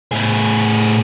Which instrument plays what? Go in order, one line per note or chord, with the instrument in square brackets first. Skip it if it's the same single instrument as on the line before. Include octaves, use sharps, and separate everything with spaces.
[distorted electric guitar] A2 G#4